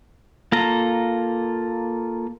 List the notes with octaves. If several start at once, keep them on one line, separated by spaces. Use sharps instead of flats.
A#3 F4 A4 A#5